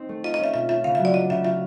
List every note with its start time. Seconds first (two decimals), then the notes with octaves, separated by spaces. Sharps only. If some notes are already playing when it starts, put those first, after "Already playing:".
Already playing: C4 D#4
0.09 A3
0.24 F4 D#5
0.34 D#5
0.39 C#4 E5
0.54 B2 E5
0.69 F4 E5
0.84 C#3 F5
0.95 E5
0.99 F#3
1.05 D5
1.14 D4 D#5
1.30 C#3 E5
1.45 F4 E5